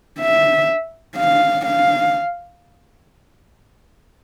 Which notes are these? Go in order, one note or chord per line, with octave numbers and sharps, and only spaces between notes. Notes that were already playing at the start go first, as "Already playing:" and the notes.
E5
F5
F5